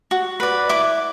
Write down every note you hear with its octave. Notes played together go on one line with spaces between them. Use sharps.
F#4
B4 D5
E4 D6